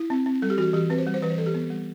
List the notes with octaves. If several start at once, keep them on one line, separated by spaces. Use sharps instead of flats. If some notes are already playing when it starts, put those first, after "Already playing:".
Already playing: E4
C4
C4
G3 A4
G4
E3 F#4
E3 G4
C4 B4
C5
G3
C5
E3 B4
C5
E3 A4
G4
B3
G3